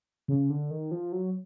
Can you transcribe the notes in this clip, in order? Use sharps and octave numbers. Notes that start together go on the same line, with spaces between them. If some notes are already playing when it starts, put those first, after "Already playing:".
C#3
D3
D#3
F3
F#3